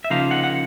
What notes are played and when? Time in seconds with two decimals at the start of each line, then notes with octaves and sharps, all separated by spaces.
0.04 E5
0.10 C#3 F3 A#3 D#4 F5
0.31 F#5
0.44 F#5